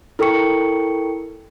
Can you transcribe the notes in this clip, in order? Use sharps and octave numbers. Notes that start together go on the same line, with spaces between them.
E4 A4 A#4 G5 C#6 C#7